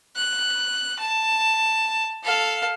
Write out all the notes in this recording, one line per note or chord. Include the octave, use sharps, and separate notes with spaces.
F#6
A5
A4 F5